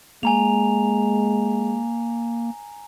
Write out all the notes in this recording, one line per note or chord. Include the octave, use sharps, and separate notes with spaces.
G#3 A#3 G#5 A#5 F7